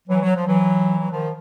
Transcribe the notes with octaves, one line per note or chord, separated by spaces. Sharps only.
E3 F#3
F#3
F3
E3 F#3
F#3
D#3 F3